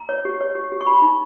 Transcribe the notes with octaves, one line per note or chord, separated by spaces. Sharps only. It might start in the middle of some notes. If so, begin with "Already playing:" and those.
Already playing: A#5
C#5
G4
C#5
G4
G4
C#6
G4 B5
D#4